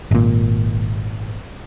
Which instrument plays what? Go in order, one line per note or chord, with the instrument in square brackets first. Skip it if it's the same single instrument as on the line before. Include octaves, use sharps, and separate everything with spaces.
[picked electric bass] G#1 A#2